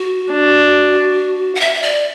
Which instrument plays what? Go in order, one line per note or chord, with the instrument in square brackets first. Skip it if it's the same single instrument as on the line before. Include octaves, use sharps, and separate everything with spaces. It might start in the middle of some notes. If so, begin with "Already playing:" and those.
Already playing: [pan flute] F#4
[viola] D4
[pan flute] F#5
E5
E5
D5